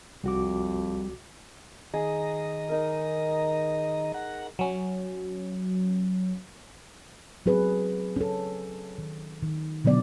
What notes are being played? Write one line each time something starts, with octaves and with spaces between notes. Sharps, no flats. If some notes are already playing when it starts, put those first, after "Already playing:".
C2 F2 G3 F#4 D6
D#3 G#4 D#5 A#5
D#4 A#4
F#5 A#5
F#3 C#4
F#3 C4 G#4 B4
C#4 A4
D#3
D#3
B2 D3 F#3 B3 D5